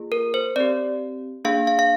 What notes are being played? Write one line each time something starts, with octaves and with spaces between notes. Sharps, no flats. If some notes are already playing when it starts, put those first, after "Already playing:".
Already playing: A#3 F4 G#4
A#4
C5
C4 G4 D5
A#3 D4 G#4 F5
F5
F5